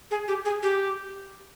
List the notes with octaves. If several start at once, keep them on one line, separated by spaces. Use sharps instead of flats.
G#4
G4
G#4
G4